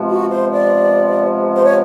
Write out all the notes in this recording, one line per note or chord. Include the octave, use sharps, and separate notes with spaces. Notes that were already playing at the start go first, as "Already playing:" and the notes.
Already playing: C3 F3 G#3 B3
F#4
C5
D5
C5
C#5